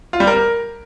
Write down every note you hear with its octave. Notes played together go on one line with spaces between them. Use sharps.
F4
G3
A#4